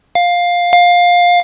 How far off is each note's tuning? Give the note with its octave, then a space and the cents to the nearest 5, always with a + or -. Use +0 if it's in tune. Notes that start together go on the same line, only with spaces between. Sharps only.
F5 +10
F5 +15